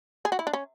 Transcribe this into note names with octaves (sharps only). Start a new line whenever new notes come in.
G#4
F#4
E4
D4
C#4